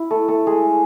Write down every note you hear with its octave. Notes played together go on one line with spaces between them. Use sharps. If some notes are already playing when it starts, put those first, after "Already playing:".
Already playing: E4
A3 A4
A3 A4
G#3 G#4